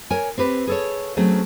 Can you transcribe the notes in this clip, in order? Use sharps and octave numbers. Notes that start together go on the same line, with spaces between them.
A#4 C#5 G#5
C4 G4 B4
G#4 A4 C#5
F#3 A3 C4 C#4 G#4